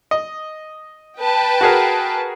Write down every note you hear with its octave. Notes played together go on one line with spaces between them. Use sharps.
D#5
B4 G5 A5
F#4 G#4 A#4